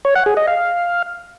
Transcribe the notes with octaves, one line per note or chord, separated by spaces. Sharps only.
C#5
F#5
G#4
D#5
F5